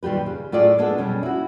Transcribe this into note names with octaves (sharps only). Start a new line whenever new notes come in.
D#2 A#2 G3 G4 B4
C#3
A2 A3 F4 G#4 D5
G#3 B3 D4 A4
B2 G3 C#4
E4 F#4